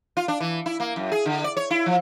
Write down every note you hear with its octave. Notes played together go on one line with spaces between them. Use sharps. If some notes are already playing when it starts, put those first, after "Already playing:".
F4
D4
E3
E4
A#3
F#2
G#4
D3
D5
C#5
E4
F3